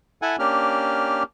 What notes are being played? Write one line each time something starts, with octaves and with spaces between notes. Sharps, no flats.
E4 A4 F#5 G#5
A#3 C#4 D4 G4 F6